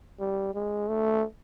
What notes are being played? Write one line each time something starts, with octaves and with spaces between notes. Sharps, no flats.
G3
G#3
A3